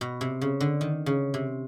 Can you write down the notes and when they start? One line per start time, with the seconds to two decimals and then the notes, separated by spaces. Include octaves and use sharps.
0.01 B2
0.21 C3
0.41 C#3
0.60 D3
0.81 D#3
1.06 C#3
1.34 C3